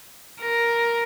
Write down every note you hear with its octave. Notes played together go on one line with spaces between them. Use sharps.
A#4